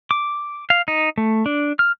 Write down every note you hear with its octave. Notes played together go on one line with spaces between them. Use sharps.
D6
F5
D#4
A3
D4
F6